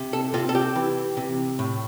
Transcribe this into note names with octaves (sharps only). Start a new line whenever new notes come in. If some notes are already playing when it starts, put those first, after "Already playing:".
Already playing: C3
A4
C3 F4
A4
G4
E3
C3
A2